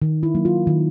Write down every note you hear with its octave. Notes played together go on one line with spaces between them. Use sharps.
D#3
E4
F#3 A#3
F4
D#3